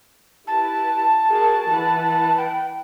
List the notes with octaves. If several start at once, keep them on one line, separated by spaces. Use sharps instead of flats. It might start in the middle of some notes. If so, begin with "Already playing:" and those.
E4 G4 B4 A5
F#4 G#4 A#4
E3 B4 F#5
G5